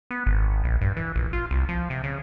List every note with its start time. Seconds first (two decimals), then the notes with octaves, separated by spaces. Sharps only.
0.11 B3
0.26 G#1
0.64 A#1
0.81 G2
0.96 E3
1.16 A#1
1.33 F4
1.51 C2
1.69 F3
1.90 C3
2.04 C#3